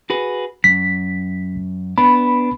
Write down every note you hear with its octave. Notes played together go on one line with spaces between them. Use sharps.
F#4 G#4 B4
F#2 B6
B3 D4 B5